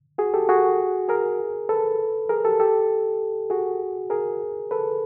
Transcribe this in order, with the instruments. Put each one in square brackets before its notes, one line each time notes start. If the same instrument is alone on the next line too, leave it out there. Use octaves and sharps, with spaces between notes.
[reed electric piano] F#4 G#4
G4 A4
F#4 G#4
G#4 A#4
A4 B4
G#4 A#4
G4 A4
G4 A4
F#4 G#4
G#4 A#4
A4 B4